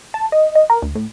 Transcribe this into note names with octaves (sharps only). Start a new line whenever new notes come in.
A5
D#5
D#5
A#4
D2
A2